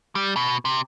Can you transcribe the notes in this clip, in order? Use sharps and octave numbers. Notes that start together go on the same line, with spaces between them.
G3
B2
C3